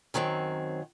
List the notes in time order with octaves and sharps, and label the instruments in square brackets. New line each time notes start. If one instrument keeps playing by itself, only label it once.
[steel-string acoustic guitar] F#2 D#3 F#3 C4